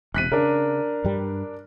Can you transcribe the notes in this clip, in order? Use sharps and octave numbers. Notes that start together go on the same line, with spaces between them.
E1 C3 F#6 B6 D#7
C#3 D4 A#4
G2 G3